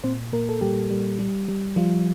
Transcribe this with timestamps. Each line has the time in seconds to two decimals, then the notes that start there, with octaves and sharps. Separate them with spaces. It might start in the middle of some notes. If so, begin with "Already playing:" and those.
0.04 A#2 C4 C5
0.33 A#2 A#3 A#4
0.49 A4
0.61 A#2 G3 G4
0.91 G3
1.19 G3
1.48 G3
1.76 F3 G3 F4